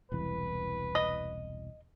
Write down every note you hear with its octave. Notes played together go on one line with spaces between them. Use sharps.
E1 C2 E3 B4
D#5